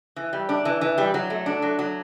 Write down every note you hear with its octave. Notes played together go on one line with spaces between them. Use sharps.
E3
G3
D4
E3
E3
G3
F#3
A3
D4
F#3
F#3